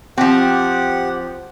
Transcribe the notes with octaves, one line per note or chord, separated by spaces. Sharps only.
F3 C4 G4 F#5